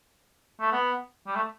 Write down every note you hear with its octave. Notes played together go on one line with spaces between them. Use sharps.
A3
B3
G3
A3